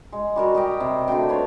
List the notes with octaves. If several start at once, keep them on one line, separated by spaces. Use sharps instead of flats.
G#3
G3 F#4 A#4
G4 D#5 G5
C3
D3 A3 F#4 G5
F4 B4 C#5